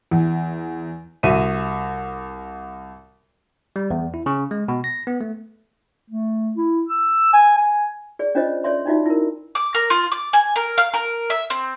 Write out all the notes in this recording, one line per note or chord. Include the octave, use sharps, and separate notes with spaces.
E2
C2 F#4 E5 D#7
G3
E2
E4
C#3
G#3
B2
A#6
B3
A3
A3
E4
E6
G#5
G#5
G#4 D5
C#4 D4 F4 C5 C#5 D#5
A4 C#5 D5 E5 C6
D4 D#4 F4 F#4 E5
E4 A#4
D6
A#4
F4
D6
G#5
A#4
F5
A#4
E5
C4